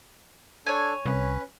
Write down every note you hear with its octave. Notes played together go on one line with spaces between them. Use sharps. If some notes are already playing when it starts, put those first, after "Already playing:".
D4 A4 C#5 G#5
C2 C#4 B4